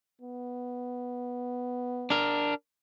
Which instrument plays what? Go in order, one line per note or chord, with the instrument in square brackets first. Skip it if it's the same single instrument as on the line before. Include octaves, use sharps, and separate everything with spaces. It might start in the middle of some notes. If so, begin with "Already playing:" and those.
[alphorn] B3
[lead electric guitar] D4 A#4